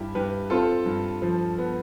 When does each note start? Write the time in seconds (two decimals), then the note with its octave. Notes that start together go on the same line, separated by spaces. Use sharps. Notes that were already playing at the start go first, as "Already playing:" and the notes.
Already playing: G2 E4 G4
0.15 G2 G4 B4
0.50 C4 F4 A4
0.86 G2
1.22 F3
1.58 B3